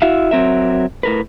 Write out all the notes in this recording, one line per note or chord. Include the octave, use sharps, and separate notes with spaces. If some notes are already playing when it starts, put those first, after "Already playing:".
E4 F#4 E5 F5
F#3 C4 A#4 E5
A2 A#4 B4